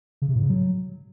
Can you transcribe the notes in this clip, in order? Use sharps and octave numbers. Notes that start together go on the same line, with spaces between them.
C#3
C3
A2
C#3
F#3